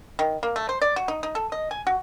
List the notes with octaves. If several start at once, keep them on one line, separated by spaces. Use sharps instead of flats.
D#3
A#3
A3
C5
D5
F#4
D#4
D#4
A4
D#5
G#5
F#4